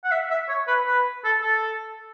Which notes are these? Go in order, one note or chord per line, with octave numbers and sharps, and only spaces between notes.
F#5
E5
E5
C#5
B4
B4
A4
A4